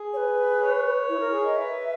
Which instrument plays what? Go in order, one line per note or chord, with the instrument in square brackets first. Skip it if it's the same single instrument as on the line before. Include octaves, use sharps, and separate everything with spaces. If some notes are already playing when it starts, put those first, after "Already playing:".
Already playing: [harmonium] G#4
[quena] C#5
B4
[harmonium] C#5
[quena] E4
A#4
[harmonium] G#4
[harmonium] A#4 [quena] D#5
[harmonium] B4 [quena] E5